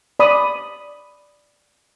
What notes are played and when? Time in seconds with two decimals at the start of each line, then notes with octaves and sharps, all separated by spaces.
0.19 D5 B5 D#6